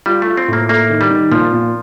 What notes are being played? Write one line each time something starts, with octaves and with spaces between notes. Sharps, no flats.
G3 F4
A3
F4
C4
A2 A#3
A3 A#3
D#3
G3
D#3
A#2 F3
A#2